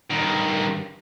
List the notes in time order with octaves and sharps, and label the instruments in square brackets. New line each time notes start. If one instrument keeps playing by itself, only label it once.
[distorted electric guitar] G2 D#3